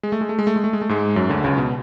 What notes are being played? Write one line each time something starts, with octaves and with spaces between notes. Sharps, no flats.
G#3
A3
G#3
A3
G#3
A3
G#3
A3
G#3
A3
G#2 G#3
F#2 F#3
D2 D3
C#2 C#3
B2